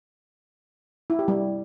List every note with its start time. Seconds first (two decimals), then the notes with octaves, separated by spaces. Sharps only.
1.10 E4
1.19 G4
1.28 G3